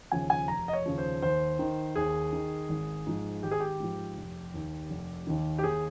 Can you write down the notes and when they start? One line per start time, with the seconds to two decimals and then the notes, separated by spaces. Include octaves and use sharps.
0.12 D#2 C#3 F3 G#5
0.30 G#5
0.48 F1 A#5
0.68 D#5
0.73 C#5
0.86 D#2 C#3 F3
0.98 C5
1.22 D#2 C5
1.59 D#3
1.96 D#2 G#4
2.33 D#3
2.69 G#1
3.07 G#2 F3
3.43 G#1 G4
3.51 G#4
3.60 G4
3.80 G#2 F3
4.17 F1
4.54 D#2 D#3
4.90 F1
5.27 D#2 D#3
5.58 G4
5.63 D#2 G#4